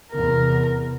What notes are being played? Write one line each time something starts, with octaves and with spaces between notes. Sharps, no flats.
E2 C3 B3 A#4